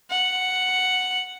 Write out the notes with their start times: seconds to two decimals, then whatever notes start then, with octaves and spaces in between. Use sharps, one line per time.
0.10 F#5